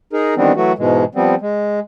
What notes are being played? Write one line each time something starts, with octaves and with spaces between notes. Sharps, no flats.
D#4 G#4 A#4
D#3 E3 G3 B3 C4 D4
E3 F#3 A3 F#4
G#2 B2 E3 G#3
F3 G3 B3 C4
G#3